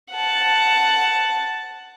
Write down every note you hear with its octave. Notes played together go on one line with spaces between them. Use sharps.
F#5 A5